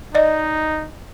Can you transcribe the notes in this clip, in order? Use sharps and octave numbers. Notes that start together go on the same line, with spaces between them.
D#4 D5 D#5